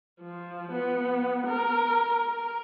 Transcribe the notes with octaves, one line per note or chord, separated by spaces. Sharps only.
F3
B3
A#4
A#4